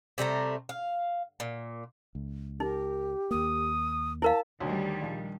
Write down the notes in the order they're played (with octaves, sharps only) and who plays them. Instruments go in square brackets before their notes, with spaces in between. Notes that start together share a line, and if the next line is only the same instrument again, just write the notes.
[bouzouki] C3 G3 A3 A#5
F5
A#2
[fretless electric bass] C#2
[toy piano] D#4 [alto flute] G4 [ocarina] A#4
[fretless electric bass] D#2 A#3 [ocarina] D#6
[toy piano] E4 A#4 F5 [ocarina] A5
[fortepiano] D2 F#3 [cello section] D#3 G3
[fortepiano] A#1